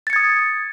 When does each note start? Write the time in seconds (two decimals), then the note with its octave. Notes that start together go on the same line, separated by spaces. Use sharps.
0.07 A6
0.10 C#7
0.13 G#6
0.16 D#6